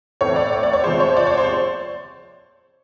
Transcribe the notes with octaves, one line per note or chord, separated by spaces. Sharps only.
A2 E3 A3 C4 C#5
D5
C#5
D5
C#5
C3 F3 G#3 C5
C#5
D5
C#5
C5